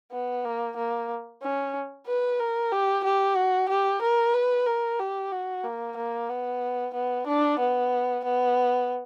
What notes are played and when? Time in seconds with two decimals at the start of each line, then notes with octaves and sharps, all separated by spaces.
0.11 B3
0.44 A#3
0.76 A#3
1.42 C#4
2.07 B4
2.39 A#4
2.72 G4
3.04 G4
3.36 F#4
3.69 G4
4.02 A#4
4.34 B4
4.67 A#4
5.00 G4
5.32 F#4
5.64 A#3
5.97 A#3
6.29 B3
6.94 B3
7.27 D4
7.59 B3
8.24 B3